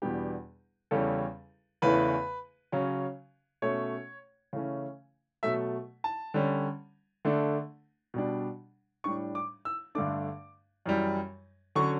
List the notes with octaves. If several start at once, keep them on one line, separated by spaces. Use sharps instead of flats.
E2 B2 G3 B3 D4 G4
E2 C#3 G3 C#4 A4
E2 C#3 E3 A3 B4
C#3 F#3 C#4
B2 A3 C#4 C#5
C#3 E3 A3 C#4
B2 F#3 A3 E5
A5
D3 G3 C#4
D3 A3 D4
B2 G3 D4
A2 G3 D4 C#6
D6
E6
G2 D3 A3 D4 D6
F#2 E3 G3
D3 F#3 C#4 C#6